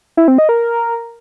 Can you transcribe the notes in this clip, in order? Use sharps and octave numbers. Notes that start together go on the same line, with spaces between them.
E4
C4
D#5
A#4